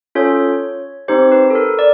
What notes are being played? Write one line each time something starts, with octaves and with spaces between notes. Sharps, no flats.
C#4 F4 A4 C#5
C4 D#4 G4 C5
B4
A4
A#4
D5